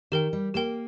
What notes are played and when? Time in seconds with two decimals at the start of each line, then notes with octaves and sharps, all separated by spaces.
0.12 D#3 G4 A#4 G5
0.33 G3
0.54 A#3 G4 A#4 G5